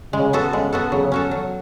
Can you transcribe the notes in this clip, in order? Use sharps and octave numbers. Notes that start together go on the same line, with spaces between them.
C#3 G#3
B3 F#4 A4
C#3 G#3
B3 F#4 A4
C#3 F#3
C#4 F#4 A4
F#3